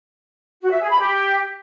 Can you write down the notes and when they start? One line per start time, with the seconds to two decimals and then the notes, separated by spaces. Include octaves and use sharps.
0.61 F#4
0.71 E5
0.80 G#4
0.89 B5
0.99 G4